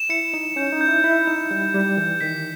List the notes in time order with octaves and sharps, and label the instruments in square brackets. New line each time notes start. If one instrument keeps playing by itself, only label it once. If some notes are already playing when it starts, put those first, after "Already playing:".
Already playing: [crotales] E7
[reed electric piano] E4 [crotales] C#7
[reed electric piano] D#4 [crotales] E7
[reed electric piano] C#4 [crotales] G6
[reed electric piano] D#4
[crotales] G6
[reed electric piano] E4
[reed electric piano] E4 [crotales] G6
[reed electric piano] D#4 [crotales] E7
[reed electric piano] G3 [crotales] G6
[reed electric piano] G3 [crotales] G6
[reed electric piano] E3 [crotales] G6
[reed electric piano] D#3 [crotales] B6